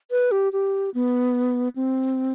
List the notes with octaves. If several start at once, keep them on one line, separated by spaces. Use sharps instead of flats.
B4
G4
G4
B3
C4